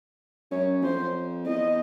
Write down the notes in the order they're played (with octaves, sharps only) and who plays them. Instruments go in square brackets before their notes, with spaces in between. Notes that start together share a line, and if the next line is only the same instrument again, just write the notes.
[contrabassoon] F#2 [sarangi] C#5
[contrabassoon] F2 [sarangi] C5
[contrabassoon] E2 [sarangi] D#5